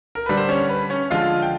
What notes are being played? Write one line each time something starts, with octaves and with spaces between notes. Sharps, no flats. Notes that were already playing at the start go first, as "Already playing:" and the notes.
A#4
D3 G3 B4
C5
C#4 C#5
B4
C#4 C#5
D3 F3 G#3 F4 F5
G5